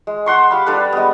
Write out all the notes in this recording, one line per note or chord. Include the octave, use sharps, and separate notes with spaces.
G#3
E5 F#5 C6 C#6
G4 F5 B5
G3 D4 A4 B4
G#3 B3